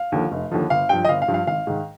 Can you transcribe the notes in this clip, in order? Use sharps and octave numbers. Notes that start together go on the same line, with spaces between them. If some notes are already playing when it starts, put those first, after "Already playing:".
Already playing: F5
D#2 D3 F3
F1
D#2 D3 F3
G1 F5
G2 F3 G5
D#5
G1 F5
F5
G2 F3
F5
G#1 F5
G#2 D#3